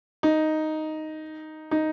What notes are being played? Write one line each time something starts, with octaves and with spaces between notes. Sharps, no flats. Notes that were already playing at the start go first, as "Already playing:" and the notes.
D#4
D#4